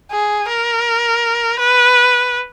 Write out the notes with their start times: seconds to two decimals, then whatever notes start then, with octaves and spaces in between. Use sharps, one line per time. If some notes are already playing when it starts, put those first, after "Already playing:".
0.11 G#4
0.49 A#4
1.59 B4